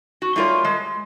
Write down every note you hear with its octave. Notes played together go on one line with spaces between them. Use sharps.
F#4
G3 A3 F4 A#4 C#5
G#3